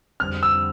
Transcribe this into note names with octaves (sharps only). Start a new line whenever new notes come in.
F2 D3 G3 C4 F6
E6